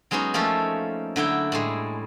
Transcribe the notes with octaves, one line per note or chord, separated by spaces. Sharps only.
F#3 G#3 B3 C#4 D#4
F3 A3 A#3 C#4 A4
D3 F#3 E4 G5
A2 G3 G#3